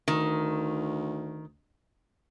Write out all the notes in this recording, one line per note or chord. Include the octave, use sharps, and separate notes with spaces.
D2 D#3